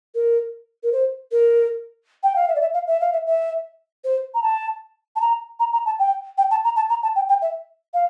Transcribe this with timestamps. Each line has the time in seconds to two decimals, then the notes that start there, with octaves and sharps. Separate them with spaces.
0.15 A#4
0.83 A#4
0.93 C5
1.32 A#4
2.23 G5
2.36 F5
2.48 E5
2.55 D5
2.61 E5
2.74 F5
2.87 E5
3.00 F5
3.13 E5
3.26 E5
4.04 C5
4.34 A#5
4.43 A5
5.16 A5
5.21 A#5
5.60 A#5
5.73 A#5
5.86 A5
5.99 G5
6.38 G5
6.51 A5
6.64 A#5
6.76 A5
6.89 A#5
7.03 A5
7.15 G5
7.29 G5
7.42 E5
7.94 F5